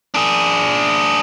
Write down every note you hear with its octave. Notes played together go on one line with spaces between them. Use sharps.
D4 G#4